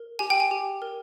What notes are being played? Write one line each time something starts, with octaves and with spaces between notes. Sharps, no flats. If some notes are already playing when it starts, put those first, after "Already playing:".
Already playing: A#4
G4 G#5
G5
G#5
G4
A#4